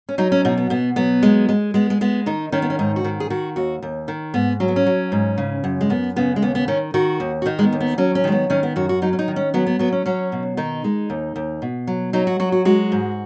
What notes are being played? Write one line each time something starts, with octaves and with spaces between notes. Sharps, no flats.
C#4
F#3 D#4
C#4
B2 D#4
B3
B2 B3
F#3 B3
G#3
G#3
G#3 B3
G#3
G#3 B3
D#3 D#4
D#3 C#4
B3
C#4
G#2 D#4
F#4
D#3
G#4
D#3 F#4
D#2 F#4
D#2
D#3
G#2 B3
F#3 C#4
B3
C#4
F#3
G#2
C#3
F#2
G#3
F#2 B3
C#3 B3
G#3
D#2 B3
B3
D#3 C#4
D#3 F#4
D#2
F#4
D#3 D#4
G#3
B3
D#2
B3
F#3 C#4
C#4
D#3 G#3
B3
D#3 C#4
B3
F#2 F#4
F#4
F#3 D#4
C#4
D#4
D#3
C#4
F#3 B3
B3
F#3 B3
C#4
F#3 C#4
B2
D#3 D#4
G#3
D#2
D#2
B2
F#3
F#3 D#4
F#4
F#3 F#4
F#4
G#3 F#4
G#2